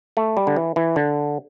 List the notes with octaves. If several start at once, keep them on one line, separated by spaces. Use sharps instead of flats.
A3
G3
D3
E3
E3
D3